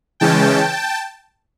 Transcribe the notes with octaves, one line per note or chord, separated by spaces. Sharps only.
C#3 E3 G#3 C#4 G5 A5